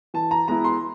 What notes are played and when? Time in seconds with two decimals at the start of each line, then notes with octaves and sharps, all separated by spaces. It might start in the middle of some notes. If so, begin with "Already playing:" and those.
0.14 E3 A5
0.31 A#5
0.48 G#3 B3 E4 A#5
0.64 C6